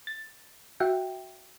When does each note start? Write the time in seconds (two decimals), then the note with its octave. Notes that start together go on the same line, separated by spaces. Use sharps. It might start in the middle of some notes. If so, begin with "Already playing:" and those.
0.07 A6
0.80 F#4 E5 F#5 G5